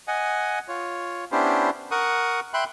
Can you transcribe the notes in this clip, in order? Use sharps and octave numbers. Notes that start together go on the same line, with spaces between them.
D#5 F#5 G#5
F4 C#5
B3 C#4 D4 E4 G4 C5
A#4 F#5 C#6 D#6
E5 G5 B5 C6 F#6